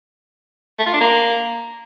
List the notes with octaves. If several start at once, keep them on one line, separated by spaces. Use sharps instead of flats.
A3
F4
D4
A#3